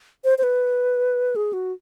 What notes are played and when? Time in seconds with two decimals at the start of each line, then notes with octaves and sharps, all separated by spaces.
0.24 C5
0.38 C5
0.43 B4
1.36 G#4
1.53 F#4